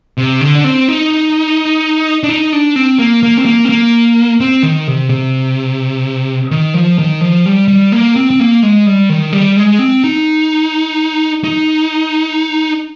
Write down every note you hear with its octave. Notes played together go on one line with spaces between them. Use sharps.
C3
D3
D4
C4
D#4
D4
D#4
D4
C4
A#3
A#3
C4
A#3
C4
A#3
C4
D#3
C3
C3
D#3
F3
D#3
F3
G3
G3
A#3
C4
C4
A#3
G#3
G3
D#3
G3
G#3
C4
D#4
D#4